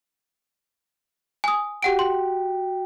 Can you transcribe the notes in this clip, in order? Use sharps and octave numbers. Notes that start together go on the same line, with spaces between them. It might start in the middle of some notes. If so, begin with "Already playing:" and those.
G#5 D#6
F#4 G4 F#5 G5 D7
C6